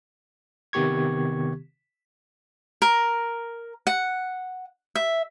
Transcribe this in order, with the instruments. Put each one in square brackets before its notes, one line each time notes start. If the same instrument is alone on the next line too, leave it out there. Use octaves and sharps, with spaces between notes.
[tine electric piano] C3 D#3 B3 G4 C#6 G#6
[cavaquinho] A#4
F#5
E5